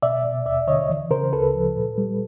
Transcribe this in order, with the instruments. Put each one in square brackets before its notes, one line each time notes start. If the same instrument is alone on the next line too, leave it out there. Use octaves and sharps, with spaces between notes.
[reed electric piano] B2 D5 E5
B2
D#2 D5 E5
D3 C#5 D#5
E3
C#3 A#4 C5
D2 A4 B4
F3
A#2
G3